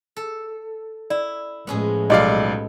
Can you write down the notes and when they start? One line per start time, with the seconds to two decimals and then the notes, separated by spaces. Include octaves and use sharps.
0.16 A4
1.10 E4 D5
1.67 A2 F3 G#3 B3 C#4 G#4
2.10 B1 B3 F#4 G4 A4 D5 D#5 F5